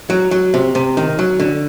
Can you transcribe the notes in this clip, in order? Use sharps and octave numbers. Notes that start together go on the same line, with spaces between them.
F#3
F#3
C3
C3
D#3
F#3
D3